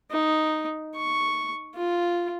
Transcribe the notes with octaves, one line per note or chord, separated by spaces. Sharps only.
D#4
C#6
F4